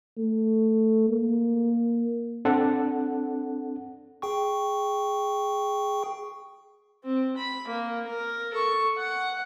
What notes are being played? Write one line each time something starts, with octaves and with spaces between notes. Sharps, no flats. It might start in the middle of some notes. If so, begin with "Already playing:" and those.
A3
A#3
C4 D4 A4 F#5
G#4 G5 C#6
C4
B5
A#3
A#4
A4 C#6
F#5